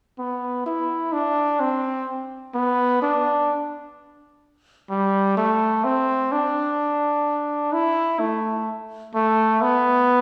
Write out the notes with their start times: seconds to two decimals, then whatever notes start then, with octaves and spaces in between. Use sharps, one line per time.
0.19 B3
0.66 E4
1.13 D4
1.60 C4
2.55 B3
3.02 D4
4.90 G3
5.37 A3
5.84 C4
6.32 D4
7.73 E4
8.20 A3
9.15 A3
9.62 B3